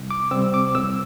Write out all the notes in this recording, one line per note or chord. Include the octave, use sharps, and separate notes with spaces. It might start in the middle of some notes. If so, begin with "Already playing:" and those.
Already playing: C2
D6
C3 G3 C4 E6
D6
C2 E6